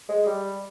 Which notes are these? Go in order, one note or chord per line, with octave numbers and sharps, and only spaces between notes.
G#3
G3